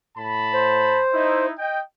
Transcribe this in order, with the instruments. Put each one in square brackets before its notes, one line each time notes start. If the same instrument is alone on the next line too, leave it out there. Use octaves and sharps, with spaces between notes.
[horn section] A2 A5 B5
[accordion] C5
[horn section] D#4 E4
D#5 G5